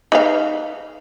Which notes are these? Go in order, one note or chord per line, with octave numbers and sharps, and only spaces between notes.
D#4 B4 F5